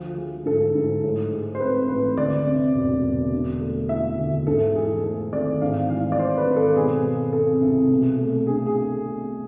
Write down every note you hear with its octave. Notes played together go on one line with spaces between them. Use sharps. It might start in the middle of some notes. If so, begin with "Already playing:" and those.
Already playing: D2 F3
G#3
G#2 A4
G#2
A2
G#3
C5
C4 B4
A1 B4
D2 D5
C3
E1
E1
D3
A3
E4 E5
D2
G#2 A4
E3 G#4
A3 A4
G#1 D5
G#2 F5
E3 F5
D5
G#3 C5
B4
G#1
A4
B2 G#4
G#3
C4 A4
C2
B2
A3
D4 G#4
G#4